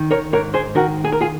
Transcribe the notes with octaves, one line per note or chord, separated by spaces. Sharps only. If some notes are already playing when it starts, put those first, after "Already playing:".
Already playing: D#3
A#4 C#5
G#2 A#4 C#5
G#4 C5
D#3 F#4 A#4
G#4
A#4
F4 G#4